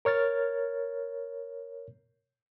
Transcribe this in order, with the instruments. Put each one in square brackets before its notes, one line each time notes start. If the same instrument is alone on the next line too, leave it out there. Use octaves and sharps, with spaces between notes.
[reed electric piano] A#4 C#5 F6 A6